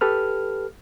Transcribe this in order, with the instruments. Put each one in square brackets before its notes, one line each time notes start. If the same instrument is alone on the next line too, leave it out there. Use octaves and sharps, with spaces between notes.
[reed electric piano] G4 A4 B4 F6